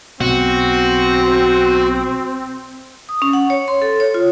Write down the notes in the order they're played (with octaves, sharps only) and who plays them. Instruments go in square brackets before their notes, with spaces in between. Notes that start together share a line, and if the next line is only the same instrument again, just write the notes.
[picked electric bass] B1 B2 [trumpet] C4 [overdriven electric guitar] F#4
[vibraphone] D#6
C#4
F#5
C#5
C6
A4
C#5
F4